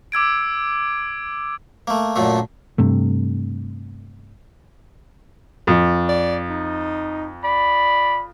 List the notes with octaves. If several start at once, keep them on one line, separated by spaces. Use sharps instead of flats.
D6 E6 G#6 D7
A3 A#3
F#2 A#2 D3 A3
G2 C3 A3
F2
D5
D#4
D5 B5